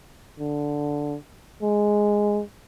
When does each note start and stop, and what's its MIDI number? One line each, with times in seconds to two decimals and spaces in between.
0.39 1.16 50
1.62 2.41 56